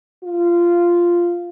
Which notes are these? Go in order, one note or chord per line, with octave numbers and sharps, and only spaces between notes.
F4